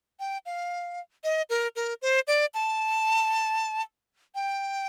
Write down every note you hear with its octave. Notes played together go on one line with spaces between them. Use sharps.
G5
F5
D#5
A#4
A#4
C5
D5
A5
G5